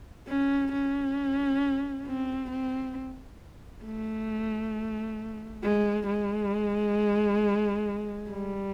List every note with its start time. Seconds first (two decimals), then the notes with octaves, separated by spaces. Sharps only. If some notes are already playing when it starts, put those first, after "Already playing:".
0.27 C#4
0.72 C#4
2.06 C4
2.51 C4
3.85 A3
5.63 G#3
6.07 G#3
8.30 G3